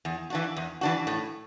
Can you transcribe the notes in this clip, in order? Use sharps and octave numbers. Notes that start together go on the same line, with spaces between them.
E2
E3 D4 F#4
E2
E3 D4 F#4
A2